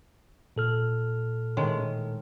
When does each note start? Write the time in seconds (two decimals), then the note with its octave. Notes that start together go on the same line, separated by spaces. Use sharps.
0.56 A#2 A4 F6
1.57 A2 D#3 G#3